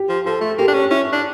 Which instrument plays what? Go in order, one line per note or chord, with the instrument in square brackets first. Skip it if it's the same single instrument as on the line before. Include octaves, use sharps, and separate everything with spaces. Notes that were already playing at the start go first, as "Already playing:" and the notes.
Already playing: [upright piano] G4
[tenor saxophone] F3
[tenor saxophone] F3 [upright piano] A4
[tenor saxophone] A3
[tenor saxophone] A#3 [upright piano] G4
[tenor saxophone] D4
C#4
[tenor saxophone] C#4 [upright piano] E4
[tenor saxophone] D4